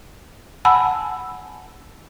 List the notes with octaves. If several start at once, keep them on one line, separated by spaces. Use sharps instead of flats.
F#5 G#5 A5 B5 E6